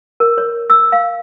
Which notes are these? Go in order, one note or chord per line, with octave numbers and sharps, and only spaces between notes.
A#4
C#5
E6
F5